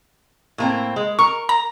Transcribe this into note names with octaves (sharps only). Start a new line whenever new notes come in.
A2 A#3 C4
G#3
A#4 C#6
A#5